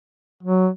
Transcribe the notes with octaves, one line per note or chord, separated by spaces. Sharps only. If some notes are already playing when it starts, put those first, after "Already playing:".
F#3